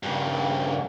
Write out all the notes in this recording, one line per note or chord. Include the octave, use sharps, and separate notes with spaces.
G2 C#3